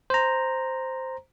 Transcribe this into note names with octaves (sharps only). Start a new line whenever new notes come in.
C5 A#5